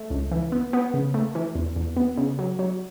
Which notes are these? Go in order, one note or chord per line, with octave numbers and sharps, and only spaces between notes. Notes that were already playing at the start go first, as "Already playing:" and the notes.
Already playing: A3
C#2
E3
B3
B3
C#3
A3
E3
E2
E2
B3
C#3
F#3
F#3